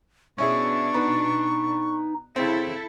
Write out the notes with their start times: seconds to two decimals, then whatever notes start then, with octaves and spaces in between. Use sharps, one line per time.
0.38 B2 C#4 D4 E4 G#4 C#6
0.94 B3 D#4
2.36 C#3 C4 E4 A4